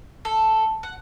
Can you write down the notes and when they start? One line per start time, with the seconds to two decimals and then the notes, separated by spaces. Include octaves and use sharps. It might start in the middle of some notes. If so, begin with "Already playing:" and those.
0.25 A4
0.83 F#5